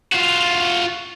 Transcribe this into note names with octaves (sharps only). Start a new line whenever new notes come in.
F4 F#4